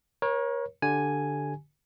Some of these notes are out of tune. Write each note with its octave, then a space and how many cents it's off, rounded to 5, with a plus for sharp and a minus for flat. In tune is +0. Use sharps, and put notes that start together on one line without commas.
A#4 +35 C#5 -15
D3 +0 G4 +0 G#5 +0